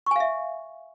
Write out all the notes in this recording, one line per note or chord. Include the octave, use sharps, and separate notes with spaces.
E5 F5 G#5 C#6